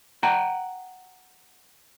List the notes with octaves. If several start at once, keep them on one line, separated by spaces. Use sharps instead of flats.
F#5 G5 A#5